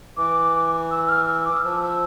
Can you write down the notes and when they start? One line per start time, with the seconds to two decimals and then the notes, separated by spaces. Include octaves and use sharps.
0.17 E3 D6
0.91 E6
1.06 E6
1.09 F6
1.28 E6
1.46 D6
1.57 F6
1.64 F3 E6
1.82 E6